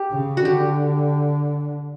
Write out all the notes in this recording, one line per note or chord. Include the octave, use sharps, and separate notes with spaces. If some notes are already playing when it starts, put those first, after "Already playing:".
Already playing: G4
C#3
F#4
D3 G4